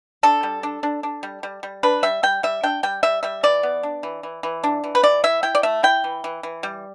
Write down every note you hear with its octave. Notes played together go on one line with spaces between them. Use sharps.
D4 A4
G3
D4
D4
D4
G3
G3
G3
D4 B4
G3 E5
G3 G5
G3 E5
D4 G5
G3 G5
G3 E5
G3 E5
E3 D5
B3
D4
E3
E3
E3
D4
E3
B4
E3 D5
E4 E5
E4 G5
D5
A3 E5
E4 G5
E3
E3
E3
G3